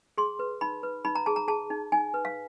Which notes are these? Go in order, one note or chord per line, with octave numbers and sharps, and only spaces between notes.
G#4 C6
B4
D#4 B5
B4
D#4 B5
A#5
G#4 A5
A#5
G#4 A5
D#4
D#4 G#5
B4
F5